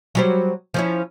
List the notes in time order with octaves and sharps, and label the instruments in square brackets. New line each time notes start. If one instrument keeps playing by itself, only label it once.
[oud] F#3 G3 C5
F3 C#4 E4